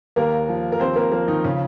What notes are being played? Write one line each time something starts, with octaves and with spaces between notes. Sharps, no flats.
D#2 A#3 A#4
F3
A#4
D#2 C4 C5
A#3 A#4
F3 A#3 A#4
D#3 D#4
C#3 C#4